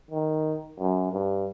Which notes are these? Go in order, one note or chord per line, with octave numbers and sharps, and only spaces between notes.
D#3
F#2
G2